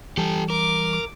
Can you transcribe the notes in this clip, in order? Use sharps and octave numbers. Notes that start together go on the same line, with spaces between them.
E3 G3 G4 A4
A#4 D6